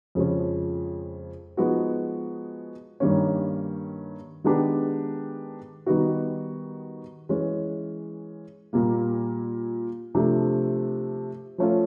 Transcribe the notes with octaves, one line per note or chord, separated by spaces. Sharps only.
F2 C#3 F3 G#3 C#4
F3 G#3 B3 D#4 F#4
G2 D#3 G3 A#3 C#4
D#3 G#3 B3 D4 G4
D#3 G3 B3 D#4 F#4
E3 G#3 C#4
A#2 G3 A#3
C3 F3 A3 D4
F3 A3 C#4 F4